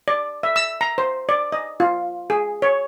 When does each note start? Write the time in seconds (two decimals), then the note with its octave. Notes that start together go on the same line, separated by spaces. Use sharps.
0.08 D5
0.43 E5
0.56 E6
0.81 A#5
0.98 C5
1.29 D5
1.52 D#5
1.80 F4
2.30 G#4
2.62 C#5